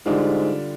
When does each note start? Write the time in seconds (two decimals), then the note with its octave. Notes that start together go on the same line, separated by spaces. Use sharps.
0.06 G#2 D3 G3 D4 F4